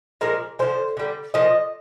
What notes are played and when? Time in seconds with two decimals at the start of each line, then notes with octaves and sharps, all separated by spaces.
0.21 A#2 F3 G#3 A#4
0.59 D3 F3 G#3 C5
0.97 D3 G3
1.34 A#2 F3 D#5